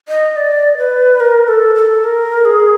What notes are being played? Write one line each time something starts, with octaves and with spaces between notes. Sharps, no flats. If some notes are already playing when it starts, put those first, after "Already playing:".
D#5
D5
B4
A#4
A4
A4
A#4
G#4